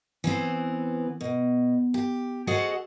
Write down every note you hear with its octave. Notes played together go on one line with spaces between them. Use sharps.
E3 B3 C4
B2
G4
F#4 G#4 A4 C5 D#5 F#5